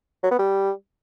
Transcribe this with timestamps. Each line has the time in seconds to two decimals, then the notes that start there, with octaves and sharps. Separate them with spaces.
0.23 F#3
0.31 B3
0.39 G3